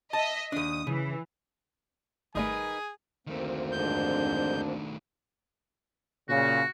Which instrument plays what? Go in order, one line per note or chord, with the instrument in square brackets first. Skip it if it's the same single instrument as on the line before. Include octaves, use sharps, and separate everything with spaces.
[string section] D#5 E5 [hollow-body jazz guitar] A5
[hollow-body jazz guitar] D#2 D4 [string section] D#6
[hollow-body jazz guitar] C#3 [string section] E3
[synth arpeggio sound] G#1 G3 A3 [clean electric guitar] D#4 A#4 B4 [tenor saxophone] G#4 [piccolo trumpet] G#5
[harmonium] D2 A#3 C4 [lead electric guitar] D#3 A3
[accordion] F2 G#2 G6 [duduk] D4
[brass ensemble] A#2 C#3 [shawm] F#4